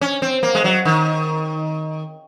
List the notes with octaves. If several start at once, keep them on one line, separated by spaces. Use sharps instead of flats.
C#4
C4
A#3
G#3
F#3
D#3